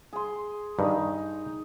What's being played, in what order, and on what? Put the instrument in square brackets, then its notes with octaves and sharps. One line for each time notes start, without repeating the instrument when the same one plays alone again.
[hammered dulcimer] G#4 C6
[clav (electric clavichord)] G2 D#3 [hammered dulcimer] D#4